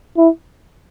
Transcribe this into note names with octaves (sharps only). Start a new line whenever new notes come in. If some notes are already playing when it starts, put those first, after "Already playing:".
E4